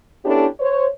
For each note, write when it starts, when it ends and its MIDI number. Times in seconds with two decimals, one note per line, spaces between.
0.24 0.46 59
0.24 0.46 61
0.24 0.46 62
0.24 0.46 64
0.24 0.46 67
0.24 0.46 69
0.60 0.85 72
0.60 0.85 73